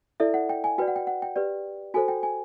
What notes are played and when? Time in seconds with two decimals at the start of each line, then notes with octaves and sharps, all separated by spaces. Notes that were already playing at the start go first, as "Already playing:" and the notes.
0.20 E4 A4 D5 E5
0.34 F#5
0.49 G5
0.64 G#5
0.78 F#4 B4 D5 G5
0.88 F#5
0.96 G5
1.07 F#5
1.22 G5
1.36 G4 B4 D5
1.94 F#4 A4 C5 G#5
2.08 G5
2.23 G#5